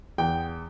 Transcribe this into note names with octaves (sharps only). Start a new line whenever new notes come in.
E2 G5